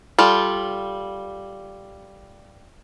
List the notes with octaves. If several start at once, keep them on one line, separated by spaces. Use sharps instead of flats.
G3 F4 A4